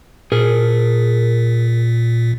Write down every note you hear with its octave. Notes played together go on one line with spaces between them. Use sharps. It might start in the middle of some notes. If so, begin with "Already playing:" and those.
A#2 G#4 A#4